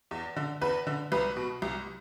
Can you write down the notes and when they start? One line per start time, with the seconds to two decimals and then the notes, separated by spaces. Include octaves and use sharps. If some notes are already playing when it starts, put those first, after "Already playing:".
0.11 E2
0.36 D3
0.61 E2 B4
0.87 D3
1.12 C2 B4
1.37 B2
1.62 C2